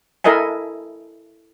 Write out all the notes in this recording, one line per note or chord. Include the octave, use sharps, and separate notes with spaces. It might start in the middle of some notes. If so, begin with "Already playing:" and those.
E4 A4 A#4 D#5 E5 G#5